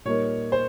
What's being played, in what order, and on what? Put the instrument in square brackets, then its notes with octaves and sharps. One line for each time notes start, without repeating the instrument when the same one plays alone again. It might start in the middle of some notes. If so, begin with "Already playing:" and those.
[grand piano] A#2 G3 A#3 D#4 A#4 [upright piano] C#5
[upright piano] C5